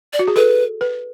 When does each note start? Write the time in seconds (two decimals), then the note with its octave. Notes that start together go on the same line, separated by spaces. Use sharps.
0.13 D5
0.19 F#4
0.28 G#4
0.36 A4 B4
0.81 B4